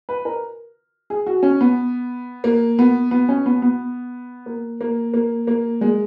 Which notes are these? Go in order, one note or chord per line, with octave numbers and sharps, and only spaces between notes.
B4
A#4
G#4
F#4
C#4
B3
A#3
B3
B3
C#4
B3
B3
A#3
A#3
A#3
A#3
G#3